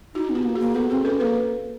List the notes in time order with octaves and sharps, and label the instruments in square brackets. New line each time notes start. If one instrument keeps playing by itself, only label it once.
[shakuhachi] D#4 [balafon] E4 F#4
[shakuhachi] B3
[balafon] F4 G4
[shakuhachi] A#3
[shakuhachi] A#3 [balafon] F#4 G#4
[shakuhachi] B3 [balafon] G4 A4
[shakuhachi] C4 [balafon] F#4 G#4
[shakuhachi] C#4 [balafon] A4 B4
[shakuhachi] A#3 [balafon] A4 B4